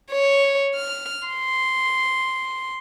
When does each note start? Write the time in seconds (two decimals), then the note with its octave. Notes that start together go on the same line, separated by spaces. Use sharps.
0.12 C#5
0.75 F6
1.28 C6